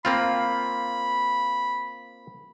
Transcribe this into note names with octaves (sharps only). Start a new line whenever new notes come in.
A#3 C4 F4 B5